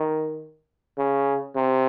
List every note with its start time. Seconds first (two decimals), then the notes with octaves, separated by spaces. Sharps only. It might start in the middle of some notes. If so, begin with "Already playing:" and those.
Already playing: D#3
0.98 C#3
1.55 C3